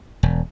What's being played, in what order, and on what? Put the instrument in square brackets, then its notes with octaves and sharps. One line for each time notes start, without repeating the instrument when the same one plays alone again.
[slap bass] E1